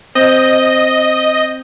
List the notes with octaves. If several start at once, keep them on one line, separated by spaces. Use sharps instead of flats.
C4 D#5